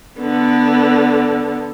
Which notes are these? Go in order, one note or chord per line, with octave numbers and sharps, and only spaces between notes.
D3 B3